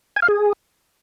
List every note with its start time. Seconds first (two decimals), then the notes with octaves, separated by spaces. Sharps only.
0.16 G#5
0.22 F5
0.28 G#4